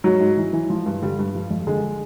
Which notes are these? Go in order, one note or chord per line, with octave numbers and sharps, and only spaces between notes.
G#2 F#3
G#2
E3
E3
F3
G2
D3 G3
G2
F3
F2
D3 G#3